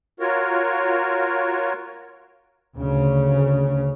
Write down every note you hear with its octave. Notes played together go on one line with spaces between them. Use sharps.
F4 F#4 A#4 C#5
D2 C#3